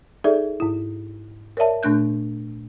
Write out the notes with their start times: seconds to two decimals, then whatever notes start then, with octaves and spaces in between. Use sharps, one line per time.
0.24 D#4 G#4 A4 D5 E5
0.60 G#2 E4
1.57 A#4 C#5 D5 E5 A5
1.83 A#2 A3 D4 F#6 G6